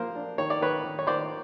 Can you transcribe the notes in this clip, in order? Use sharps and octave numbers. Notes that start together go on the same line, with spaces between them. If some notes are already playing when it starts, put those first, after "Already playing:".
Already playing: F3 A#3 A#4 C5
D4
D#3 C#5
D5
D#3 B4 C#5
D#3
C#5
D#3 C5 D5